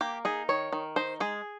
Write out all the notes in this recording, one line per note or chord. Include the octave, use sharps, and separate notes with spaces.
A#3 G4
D#4 G#4
D#3 C#5
D#3
D#4 C5
G#3 G#4